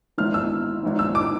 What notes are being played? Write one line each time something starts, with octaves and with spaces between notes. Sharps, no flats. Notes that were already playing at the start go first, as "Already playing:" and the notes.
G#1 G#2 E3 F6
E6
G#1 G#2 E3
E6
D6